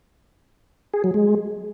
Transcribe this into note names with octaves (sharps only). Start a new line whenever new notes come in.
G#4
F#3
G#3